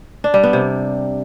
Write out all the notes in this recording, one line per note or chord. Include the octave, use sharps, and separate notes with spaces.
D4
G3
B3
C3